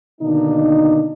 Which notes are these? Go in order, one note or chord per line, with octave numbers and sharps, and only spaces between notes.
B2 D3 D#3 A#3 D4 D#4